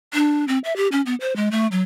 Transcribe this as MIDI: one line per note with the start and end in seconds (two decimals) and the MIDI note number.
0.13 0.45 62
0.48 0.58 60
0.64 0.75 76
0.76 0.88 67
0.92 1.01 61
1.06 1.15 59
1.21 1.35 72
1.36 1.49 56
1.51 1.67 57
1.72 1.82 54